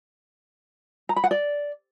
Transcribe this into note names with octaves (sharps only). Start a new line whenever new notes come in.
A#5
B5
F#5
D5